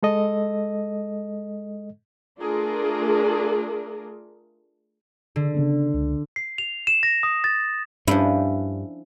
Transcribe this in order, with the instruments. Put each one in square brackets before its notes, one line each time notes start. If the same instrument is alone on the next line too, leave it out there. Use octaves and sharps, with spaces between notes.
[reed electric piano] G#3 A4 D#5
[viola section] A3 D4 F4 G#4 A#4
[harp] D3
[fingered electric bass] C#3 B3 D4
C#2
[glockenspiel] C7
F7
E7
A#6
D#6
A6
[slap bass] G2 [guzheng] F3 E4 [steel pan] C#4 D4